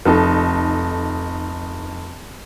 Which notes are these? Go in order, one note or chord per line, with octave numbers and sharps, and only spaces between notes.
F1 D#4 A4